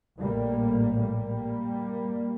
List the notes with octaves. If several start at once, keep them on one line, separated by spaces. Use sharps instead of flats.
A#1 A2 G3 A#3
G3 A#3